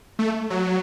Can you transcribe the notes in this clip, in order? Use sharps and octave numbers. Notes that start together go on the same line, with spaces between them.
A3
F#3